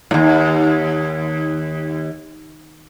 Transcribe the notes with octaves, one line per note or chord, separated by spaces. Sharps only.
D#2 A2